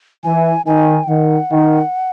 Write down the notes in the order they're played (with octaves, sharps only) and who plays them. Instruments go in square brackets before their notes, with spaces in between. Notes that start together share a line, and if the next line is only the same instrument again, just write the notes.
[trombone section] E3 [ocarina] G#5
[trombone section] D#3 [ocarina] G#5
[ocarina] G5
[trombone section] D#3 [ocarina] F#5
[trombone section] D#3